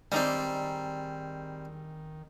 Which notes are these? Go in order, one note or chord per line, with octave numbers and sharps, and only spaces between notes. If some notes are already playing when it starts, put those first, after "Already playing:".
D#3 G3 G#3 C4 D#4 D5